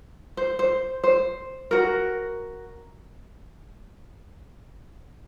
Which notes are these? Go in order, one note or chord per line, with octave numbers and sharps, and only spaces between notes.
C5
C5
C5
F#4 A#4